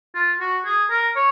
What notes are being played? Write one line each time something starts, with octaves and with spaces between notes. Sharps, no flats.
F4
F#4
G#4
A#4
C#5